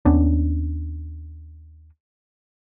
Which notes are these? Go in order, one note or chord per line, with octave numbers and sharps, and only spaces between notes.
D#2 B3 C#4 D4